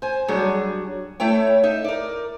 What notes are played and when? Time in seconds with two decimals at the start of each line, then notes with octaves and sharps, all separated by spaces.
0.02 C5 G#5
0.28 F#3 G3 D4 F#4 G#4
1.20 A3 E4 A4 C#5 G5
1.63 D#4 E5
1.84 A#4 D5